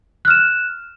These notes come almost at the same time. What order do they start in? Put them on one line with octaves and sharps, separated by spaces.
F#6 F6 E7